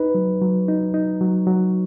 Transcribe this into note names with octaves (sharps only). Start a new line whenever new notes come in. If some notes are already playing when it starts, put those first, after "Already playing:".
Already playing: D#4 B4
F#3
F#3
D#4
D#4
F#3
F#3